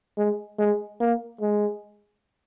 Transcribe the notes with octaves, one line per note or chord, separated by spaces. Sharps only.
G#3
G#3
A#3
G#3